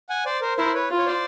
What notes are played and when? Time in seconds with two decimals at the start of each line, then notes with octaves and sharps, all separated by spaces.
0.09 F#5 G#5
0.26 C5 D5
0.42 A#4 C5
0.58 E4 A#4 C5
0.74 B4 C#5
0.90 F4
0.98 C#5
1.06 C5 D5